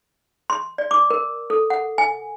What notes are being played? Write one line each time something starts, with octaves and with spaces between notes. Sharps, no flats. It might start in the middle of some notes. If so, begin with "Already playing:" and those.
C6
D5
D6
A#4
A4
F#5
G#5